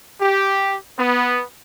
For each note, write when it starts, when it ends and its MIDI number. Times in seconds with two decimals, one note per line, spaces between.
0.20 0.75 67
0.98 1.43 59